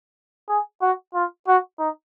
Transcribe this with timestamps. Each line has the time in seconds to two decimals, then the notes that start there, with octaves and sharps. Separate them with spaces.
0.49 G#4
0.82 F#4
1.14 F4
1.47 F#4
1.79 D#4